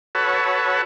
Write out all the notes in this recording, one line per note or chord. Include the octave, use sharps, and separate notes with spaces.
F#4 A4 B4 C#5